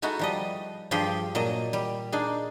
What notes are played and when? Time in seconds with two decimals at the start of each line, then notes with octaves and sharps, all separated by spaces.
0.02 G#3 D#4 E4 F#4 A4
0.19 F3 G3 D#5
0.91 G2 F3 G4 G#4 G5 C6
1.35 A#2 F#3 D#5 A5
1.73 G3
2.12 D4 D#4 G#4